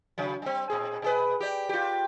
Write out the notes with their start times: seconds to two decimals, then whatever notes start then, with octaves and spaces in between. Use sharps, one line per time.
0.18 C#3 F#3
0.42 G3 C4
0.70 A#2 C4 G#4
1.02 B2 G#4 B4
1.41 G4 D5
1.69 F4 G4